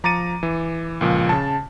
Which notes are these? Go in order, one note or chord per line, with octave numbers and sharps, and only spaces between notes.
F3 A#5 D6 A6 C#7 D#7
E3
C#2 A#2 F3
C#3 A5